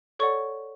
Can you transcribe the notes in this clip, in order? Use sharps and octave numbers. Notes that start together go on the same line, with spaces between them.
A4 C#5 D5 F#5 C#6